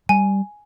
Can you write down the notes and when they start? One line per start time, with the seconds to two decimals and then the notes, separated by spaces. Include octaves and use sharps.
0.09 G3 G#5